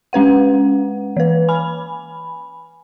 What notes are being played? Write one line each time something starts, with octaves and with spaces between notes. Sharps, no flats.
G#3 C#4 B4 F#5
E3 B4
G#5 B5